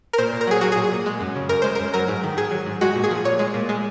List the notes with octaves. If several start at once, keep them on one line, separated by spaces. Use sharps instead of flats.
A#4
A#2 C5
A#2
A#4
F#3 G#4
F#3 F#4
A#2 G#4
A#2
G#3
F#2
C#3
F#2 A#4
G#3 C5
A#4
F#2
F#3 A#4
G#2
D#3
G#2 G#4
F#3
G#2
G#3 F#4
A#2
G#4
F3
A#2 C#5
G#3
A#2
G#3